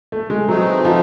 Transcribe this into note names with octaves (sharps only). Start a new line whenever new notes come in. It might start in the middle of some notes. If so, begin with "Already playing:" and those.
A3
G#3
E3 F#3 A3 C4 D#4
F3